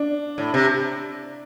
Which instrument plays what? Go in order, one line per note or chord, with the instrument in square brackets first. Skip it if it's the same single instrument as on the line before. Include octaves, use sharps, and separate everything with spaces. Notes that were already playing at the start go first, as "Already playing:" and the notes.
Already playing: [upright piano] D4
[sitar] A2
C3